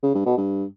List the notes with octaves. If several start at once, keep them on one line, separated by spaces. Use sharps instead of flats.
C#3
G2
B2
G2